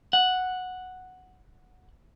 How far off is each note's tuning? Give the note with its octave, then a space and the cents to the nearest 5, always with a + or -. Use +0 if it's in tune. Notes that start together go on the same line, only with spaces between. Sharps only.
F#5 -5